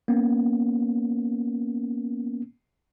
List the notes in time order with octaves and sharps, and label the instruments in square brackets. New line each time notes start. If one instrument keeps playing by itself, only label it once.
[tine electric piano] A#3 B3 C#4